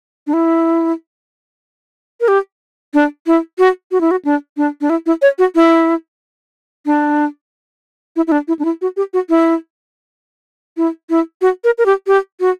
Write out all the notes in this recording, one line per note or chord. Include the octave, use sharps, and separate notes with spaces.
D4
E4
A#4
G4
D4
E4
F#4
F#4
E4
F#4
D4
D4
D4
E4
E4
C#5
F#4
E4
D4
E4
E4
D4
E4
D4
E4
F#4
G4
F#4
E4
E4
E4
F#4
A#4
A#4
G4
G4
F#4